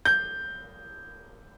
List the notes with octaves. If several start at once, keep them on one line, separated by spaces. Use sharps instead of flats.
G6